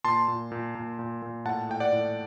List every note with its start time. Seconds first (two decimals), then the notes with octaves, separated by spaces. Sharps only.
0.05 A#2 A5 C6
0.28 A#2
0.52 A#2
0.75 A#2
0.99 A#2
1.22 A#2
1.45 A2 F#5 A5
1.69 A2 G5
1.80 D5 F#5
1.93 A2